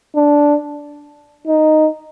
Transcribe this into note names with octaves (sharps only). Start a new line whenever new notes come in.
D4
D#4